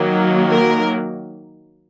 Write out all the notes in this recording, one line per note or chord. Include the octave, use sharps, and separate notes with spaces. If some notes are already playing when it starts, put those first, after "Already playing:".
Already playing: D#3 F#3 A#3
A#4